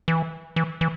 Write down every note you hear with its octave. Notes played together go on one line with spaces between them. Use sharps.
E3
E3
E3